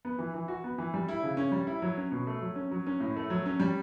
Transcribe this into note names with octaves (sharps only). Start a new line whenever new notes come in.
B3
E3
E3
F#4
B3
E3
G3
E4
C#3
C#4
G3
E4
F#3
C#4
B2
A3
F#3
C#4
F#3
C#4
A2
A3
F#3
C#4
G3